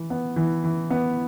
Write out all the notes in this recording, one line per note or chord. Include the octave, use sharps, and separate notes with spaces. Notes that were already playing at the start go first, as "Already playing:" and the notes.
Already playing: E3
B3
E3
E3
B3